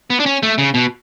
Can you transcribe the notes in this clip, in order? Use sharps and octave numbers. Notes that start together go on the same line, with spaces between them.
B3
D4
C#4
A3
C#3
B2